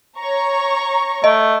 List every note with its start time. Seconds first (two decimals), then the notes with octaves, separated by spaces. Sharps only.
0.19 C#5 A#5 C#6
1.24 A3 D#5